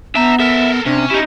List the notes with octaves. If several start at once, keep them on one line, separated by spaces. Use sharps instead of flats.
B3 D4 E5 A#5
A4 A#4 E5
C3 C#4 D4
D#4 E4 G4